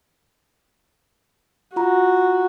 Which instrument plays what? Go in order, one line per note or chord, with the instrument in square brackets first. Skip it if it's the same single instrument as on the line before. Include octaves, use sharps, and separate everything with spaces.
[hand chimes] F4 A#5 [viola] F#4